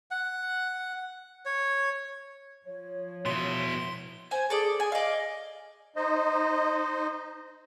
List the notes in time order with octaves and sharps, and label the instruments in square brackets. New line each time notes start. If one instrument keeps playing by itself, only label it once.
[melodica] F#5
C#5
[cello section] F3 [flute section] C#5
[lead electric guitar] B2 E4 [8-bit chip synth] C6
[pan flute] C5 [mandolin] G#5
[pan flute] G#4 [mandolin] A4 D5
[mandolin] G#5
[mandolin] D5 F5 [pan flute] D#5
[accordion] D#4 C5 D#5